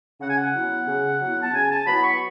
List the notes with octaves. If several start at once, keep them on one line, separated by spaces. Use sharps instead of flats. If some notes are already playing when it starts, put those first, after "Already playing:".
C#3 F#5
G#5
F#5
F#3 B3 E4
C#3
F#3 B3 E4
A5
C#3 G#5
A5
F#3 B3 E4 B5
C#6